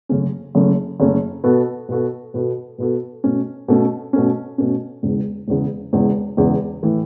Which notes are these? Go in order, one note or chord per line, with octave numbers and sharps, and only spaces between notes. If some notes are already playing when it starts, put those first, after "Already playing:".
F#1 F#2 C#3 A3 C#4
F#1 F#2 C#3 A3 C#4
F#1 F#2 C#3 A3 C#4
B2 B3 F#4 A4
B2 B3 F#4 A4
B2 B3 F#4 A4
B2 B3 F#4 A4
B2 A3 C#4
B2 A3 C#4
B2 A3 C#4
B2 A3 C#4
E1 E2 C#3
E1 E2 C#3
E1 E2 C#3
E1 E2 C#3
A2 E3 A3